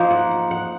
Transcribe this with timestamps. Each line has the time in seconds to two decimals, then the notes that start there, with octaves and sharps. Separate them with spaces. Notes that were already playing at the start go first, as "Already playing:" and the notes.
Already playing: F3 A#3 D#4
0.11 F#5
0.31 F#5
0.51 F#5